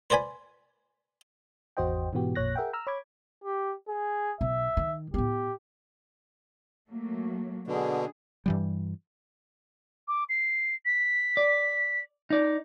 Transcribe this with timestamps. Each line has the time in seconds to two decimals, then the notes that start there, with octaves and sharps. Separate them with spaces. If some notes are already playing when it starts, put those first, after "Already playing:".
0.10 B4 C5 D5 G#5 B5
1.77 G#1 E2 F#4 C5 D#5 G5
2.13 G#2 B2 E3 B3 F#4 G4
2.35 A1 F2 A#2 C#5 F#6 A#6
2.55 G#4 A#4 E5 F#5 G5
2.73 A#5 E6 F6
2.87 C#5 B5 D6 G#6
3.44 G4
3.88 G#4
4.41 B1 E5
4.77 D#3
5.14 A2 B3 G4
6.89 F#3 A3 A#3
7.67 B2 D3 D4 G#4
8.46 G2 E3 G3
10.08 D6
10.29 C7
10.85 B6
11.37 D5
12.30 D#4 D5